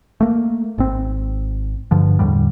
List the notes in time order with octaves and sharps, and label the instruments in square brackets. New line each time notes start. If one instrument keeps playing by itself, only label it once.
[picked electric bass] A3 A#3
G#1 C4
G2 D3 F3
E2 A2 D3 G3